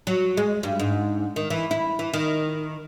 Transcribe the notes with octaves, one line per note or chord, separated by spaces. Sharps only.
F#3
G#3
G2
G#2
D#3
E3
E4
E3
D#3